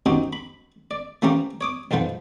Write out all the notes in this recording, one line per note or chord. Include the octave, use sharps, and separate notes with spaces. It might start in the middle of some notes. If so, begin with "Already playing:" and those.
D#3 C4 C#4 D#4 F#4 G4
B5
D5
E3 A#3 C4 C#4 G4 A#4
C#5 D6 D#6
B1 F2 G#2 F3 B4 F#5